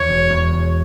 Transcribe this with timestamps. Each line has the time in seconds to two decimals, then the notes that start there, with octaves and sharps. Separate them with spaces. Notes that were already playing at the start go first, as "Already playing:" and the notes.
Already playing: E2 C#5
0.09 E1
0.30 E2
0.53 E1